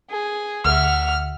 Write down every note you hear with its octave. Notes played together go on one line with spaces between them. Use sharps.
G#4
D2 E5 F#5 F6